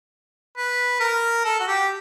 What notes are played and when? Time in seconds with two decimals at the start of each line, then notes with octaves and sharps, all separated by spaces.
0.57 B4
1.00 A#4
1.45 A4
1.60 F#4
1.67 G4